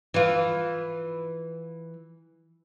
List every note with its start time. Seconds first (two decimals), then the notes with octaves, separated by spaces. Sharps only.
0.14 E3 F4